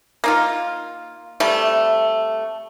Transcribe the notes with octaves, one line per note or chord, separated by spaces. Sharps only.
A#3 D#4 F4
C3 G3 A3